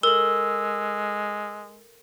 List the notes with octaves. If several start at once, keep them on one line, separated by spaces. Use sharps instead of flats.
G#3 A4 A#4 E6